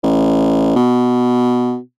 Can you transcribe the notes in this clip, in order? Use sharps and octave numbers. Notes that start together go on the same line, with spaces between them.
A1
B2